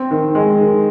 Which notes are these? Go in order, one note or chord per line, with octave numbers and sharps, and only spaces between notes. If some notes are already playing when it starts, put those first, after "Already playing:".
Already playing: C4
D#3
G#3
D#3